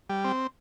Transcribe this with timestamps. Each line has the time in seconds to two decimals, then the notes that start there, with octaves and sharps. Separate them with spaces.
0.10 G3
0.24 C4